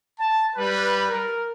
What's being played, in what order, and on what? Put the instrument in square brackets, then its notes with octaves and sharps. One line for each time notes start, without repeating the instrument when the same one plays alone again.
[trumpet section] A5
G3 B4
A#4